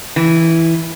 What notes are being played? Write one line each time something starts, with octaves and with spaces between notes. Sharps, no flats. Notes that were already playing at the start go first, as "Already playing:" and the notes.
E3